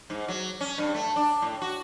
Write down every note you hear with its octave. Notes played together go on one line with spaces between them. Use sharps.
G#2
F#3
C#4
G2
A3
D4
A2
F#4